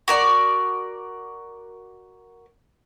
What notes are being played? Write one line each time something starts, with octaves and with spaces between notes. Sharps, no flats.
F#4 A#4 D5